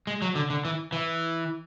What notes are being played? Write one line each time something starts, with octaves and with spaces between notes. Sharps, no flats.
G#3
F#3
D3
D3
E3
E3